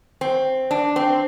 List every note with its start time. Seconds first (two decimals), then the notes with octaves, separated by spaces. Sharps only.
0.21 C4
0.71 D4
0.96 C4